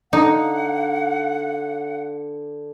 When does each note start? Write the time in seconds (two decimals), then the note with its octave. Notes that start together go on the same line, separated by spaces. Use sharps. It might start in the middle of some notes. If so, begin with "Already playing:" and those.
0.13 D3 D#4 F5 F#5